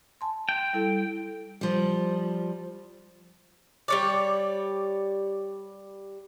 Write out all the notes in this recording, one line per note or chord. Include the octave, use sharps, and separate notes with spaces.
G#5 A5 C6
G5
G3 E4 A4
F3 G3
G3 C#5 D5